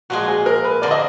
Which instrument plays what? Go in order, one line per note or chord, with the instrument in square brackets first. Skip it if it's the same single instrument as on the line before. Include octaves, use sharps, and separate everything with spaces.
[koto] A#2 F3 G#3 [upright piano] F#4
[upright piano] G#4
A#4
B4
[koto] D3 F3 A#3 [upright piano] D5
[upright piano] D#5